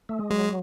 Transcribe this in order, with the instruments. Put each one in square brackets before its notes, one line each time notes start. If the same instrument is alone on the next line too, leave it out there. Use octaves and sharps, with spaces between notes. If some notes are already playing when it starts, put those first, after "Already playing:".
[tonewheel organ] A3
G#3
[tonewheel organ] F#3 [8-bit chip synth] G#3